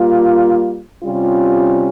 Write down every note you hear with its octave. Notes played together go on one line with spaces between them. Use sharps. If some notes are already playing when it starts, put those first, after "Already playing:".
Already playing: G3 A#3 F4
C3 G3 C#4 F4